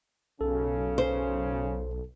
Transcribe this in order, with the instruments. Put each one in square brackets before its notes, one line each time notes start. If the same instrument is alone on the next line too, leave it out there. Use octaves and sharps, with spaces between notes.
[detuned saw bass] B1 [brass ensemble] F#2 C#3 C#4 [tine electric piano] A4
[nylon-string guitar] C5